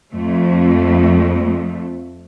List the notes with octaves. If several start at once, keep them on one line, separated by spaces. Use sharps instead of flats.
F2 A3